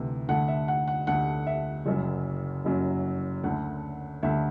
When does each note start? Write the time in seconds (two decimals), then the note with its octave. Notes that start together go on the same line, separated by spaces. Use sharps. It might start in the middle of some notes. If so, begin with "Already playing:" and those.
Already playing: D2 C3 E3 A3
0.28 D2 D3 A3 F#5
0.48 E5
0.68 F#5
0.88 F#5
1.07 D2 D3 A3 F#5
1.47 E5
1.86 F#1 F#2 F#3
2.65 F#1 F#2 F#3
3.43 D2 D3 A3 F#5
4.23 D2 D3 A3 E5